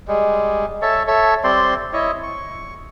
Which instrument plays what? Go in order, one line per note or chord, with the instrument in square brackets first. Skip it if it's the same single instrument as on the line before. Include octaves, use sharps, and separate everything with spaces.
[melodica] G3 G#3
A4 C#5 E5 A5
A4 C#5 E5
G3 C4 D5 C6
E4 C#5 D#5
C#6